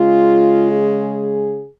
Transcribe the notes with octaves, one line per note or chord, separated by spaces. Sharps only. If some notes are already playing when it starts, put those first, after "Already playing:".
Already playing: C#3 G#3 F4
G#4